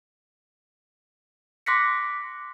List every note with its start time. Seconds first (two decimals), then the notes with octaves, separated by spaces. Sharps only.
1.66 C6 D6 F#6 A#6 B6 C#7